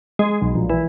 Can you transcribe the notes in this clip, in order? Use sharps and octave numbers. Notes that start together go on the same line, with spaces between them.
G#3
B1
A#1
E3